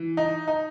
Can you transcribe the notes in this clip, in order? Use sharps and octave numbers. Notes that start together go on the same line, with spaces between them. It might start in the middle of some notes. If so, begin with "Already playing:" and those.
Already playing: E3
D#4
D#4